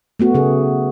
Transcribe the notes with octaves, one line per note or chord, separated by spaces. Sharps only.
A3 B3 F#4
C#3 G#4